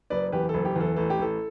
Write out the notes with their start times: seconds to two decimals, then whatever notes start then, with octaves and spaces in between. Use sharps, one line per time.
0.10 F#1 B4 D5
0.32 E2 G4 B4
0.49 F#1 A4
0.65 G4
0.76 E2 A4
0.96 A1 A4
1.10 G4
1.19 A1 A4